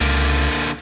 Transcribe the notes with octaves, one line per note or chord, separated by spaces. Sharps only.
C#2 D3 A#3